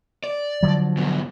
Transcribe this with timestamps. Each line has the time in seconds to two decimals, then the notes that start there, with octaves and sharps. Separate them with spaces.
0.24 D5
0.63 D3 F3 F#3
0.97 G#2 B2